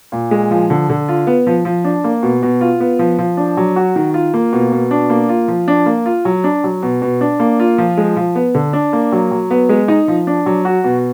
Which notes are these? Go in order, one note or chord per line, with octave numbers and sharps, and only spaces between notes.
A#2
G#3
F3
D3
D3
F4
B3
F3
F3
D4
A#3
B2
B2
F4
B3
F3
F3
D4
F#3
F#4
D#3
F4
A#3
B2
B2
D4
A#3
F4
F3
D4
A#3
F4
F#3
D4
F#3
B2
B2
D4
A#3
F4
F3
G#3
F3
B3
D3
D4
A#3
F#3
F#3
B3
G#3
D#4
F3
D4
F#3
F#4
B2